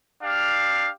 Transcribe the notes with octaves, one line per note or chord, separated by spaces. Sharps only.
D4 G4 F5